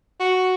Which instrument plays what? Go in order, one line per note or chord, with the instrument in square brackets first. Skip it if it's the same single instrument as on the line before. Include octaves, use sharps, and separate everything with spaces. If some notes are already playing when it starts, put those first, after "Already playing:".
[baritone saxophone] F#4